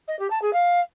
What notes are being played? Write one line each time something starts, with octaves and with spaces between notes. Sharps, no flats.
D#5
G4
A5
G#4
F5